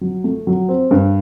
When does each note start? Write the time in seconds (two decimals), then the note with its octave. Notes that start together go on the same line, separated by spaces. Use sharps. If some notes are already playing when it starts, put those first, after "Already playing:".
0.01 F#3
0.24 A3
0.47 F#3
0.69 C4
0.91 G2